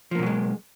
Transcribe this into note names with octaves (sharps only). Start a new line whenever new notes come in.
B2 F3 F#3 G#3 A#3